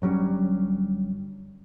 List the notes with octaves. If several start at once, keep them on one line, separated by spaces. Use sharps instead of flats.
G1 F#3 G3 C#4